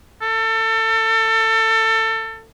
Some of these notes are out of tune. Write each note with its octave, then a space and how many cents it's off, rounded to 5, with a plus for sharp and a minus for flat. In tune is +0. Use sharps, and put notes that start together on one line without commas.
A4 +25